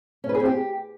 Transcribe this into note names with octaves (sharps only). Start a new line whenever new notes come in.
C#4
B4
G#4
C4
G4